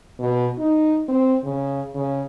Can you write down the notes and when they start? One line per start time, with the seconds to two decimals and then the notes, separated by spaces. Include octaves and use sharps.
0.19 B2
0.58 D#4
1.08 C4
1.44 C#3
1.95 C#3